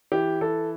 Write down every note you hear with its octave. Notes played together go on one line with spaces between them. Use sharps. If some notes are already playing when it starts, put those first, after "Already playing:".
E3 G4
E3 A4